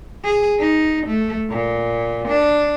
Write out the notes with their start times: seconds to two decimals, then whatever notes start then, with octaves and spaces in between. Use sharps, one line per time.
0.24 G#4
0.60 D#4
1.07 A3
1.50 A#2
2.29 D4